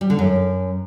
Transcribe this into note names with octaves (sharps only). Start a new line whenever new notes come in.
G3
D3
F#2